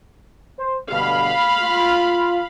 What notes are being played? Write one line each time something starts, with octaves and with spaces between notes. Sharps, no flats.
C5
G2 B2 D3 F5 B5
F4